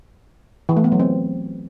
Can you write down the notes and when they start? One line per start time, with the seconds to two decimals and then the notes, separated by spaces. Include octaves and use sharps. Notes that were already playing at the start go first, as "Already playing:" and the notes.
0.69 E3
0.77 A3
0.84 B3
0.92 F#3
1.00 C4